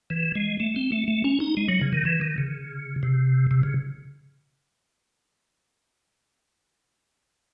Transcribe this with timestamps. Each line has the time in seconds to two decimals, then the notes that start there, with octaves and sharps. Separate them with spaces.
0.10 E3
0.35 G#3
0.60 A3
0.76 C4
0.92 A3
1.08 A3
1.24 C#4
1.40 D#4
1.57 G#3
1.69 F#3
1.81 C#3
1.93 D#3
2.05 E3
2.21 D#3
2.38 C#3
3.03 C3
3.51 C3
3.63 C#3